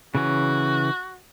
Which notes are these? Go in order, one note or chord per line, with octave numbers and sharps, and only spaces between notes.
C#3 E3 C#4 F#4